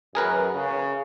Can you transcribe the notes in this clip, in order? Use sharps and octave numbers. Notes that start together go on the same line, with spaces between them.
F#2 G#4 A#4 B4
C#3